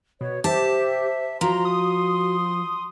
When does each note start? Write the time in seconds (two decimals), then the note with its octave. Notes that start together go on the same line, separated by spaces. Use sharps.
0.21 B2 C#5
0.44 G4 C5 E5 A5
1.41 F3 F#4 A#5 C6
1.65 D#6